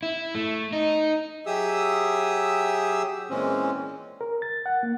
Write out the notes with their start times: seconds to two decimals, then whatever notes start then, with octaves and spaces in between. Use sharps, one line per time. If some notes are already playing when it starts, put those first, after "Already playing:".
0.03 E4
0.35 A3
0.73 D#4
1.46 F#3 G4 G#4 E5 D#6 E6
3.30 A#2 E3 G#3 C4 C#4
4.21 A#4
4.42 A6
4.66 F#5
4.83 A#3